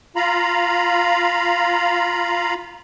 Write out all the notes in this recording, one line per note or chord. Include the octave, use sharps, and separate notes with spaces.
F4 F5 A#5 B5